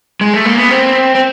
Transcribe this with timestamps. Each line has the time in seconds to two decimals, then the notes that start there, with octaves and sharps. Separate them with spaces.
0.21 G#3
0.34 A3
0.45 A#3
0.58 B3
0.70 C4
1.15 C4